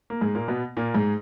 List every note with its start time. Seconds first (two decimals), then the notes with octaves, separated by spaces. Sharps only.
0.10 A#3
0.21 G#2 G#3
0.35 A#2 A#3
0.48 B2 B3
0.77 A#2 A#3
0.95 G#2 G#3